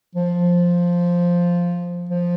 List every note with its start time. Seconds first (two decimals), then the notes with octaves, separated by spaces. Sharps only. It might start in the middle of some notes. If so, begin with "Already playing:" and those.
0.15 F3
2.09 F3